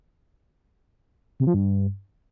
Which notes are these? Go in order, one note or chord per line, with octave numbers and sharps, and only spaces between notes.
C3
F3
G2